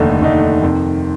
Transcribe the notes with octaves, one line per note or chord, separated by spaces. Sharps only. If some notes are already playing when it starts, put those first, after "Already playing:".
Already playing: F1 D#2 D3 A3 D#4
F1 D#2 D3 A3 D#4
F2 C3 D#3